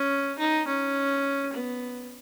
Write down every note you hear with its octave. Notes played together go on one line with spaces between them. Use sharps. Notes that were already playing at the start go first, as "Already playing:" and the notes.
Already playing: C#4
D#4
C#4
B3